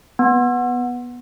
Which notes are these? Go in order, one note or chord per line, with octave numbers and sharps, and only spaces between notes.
B3